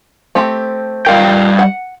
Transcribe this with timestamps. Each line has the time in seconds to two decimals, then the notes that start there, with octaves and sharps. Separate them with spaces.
0.35 A3 C4 G4
1.06 G3 F4 A#4 F5 G5
1.59 F#5